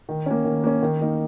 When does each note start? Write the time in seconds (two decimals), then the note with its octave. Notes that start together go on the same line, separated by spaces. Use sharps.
0.09 D#3
0.26 A#3 C#4
0.45 D#3
0.64 A#3 C#4
0.82 D#3
1.01 A#3 D#4 A#4